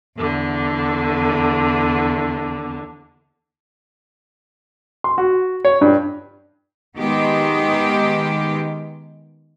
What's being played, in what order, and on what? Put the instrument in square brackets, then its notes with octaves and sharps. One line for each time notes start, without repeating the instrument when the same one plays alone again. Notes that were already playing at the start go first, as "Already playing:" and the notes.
[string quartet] E2 D3
[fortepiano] C6
F#4
C#5
G2
[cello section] D#3 G#3 B3 G4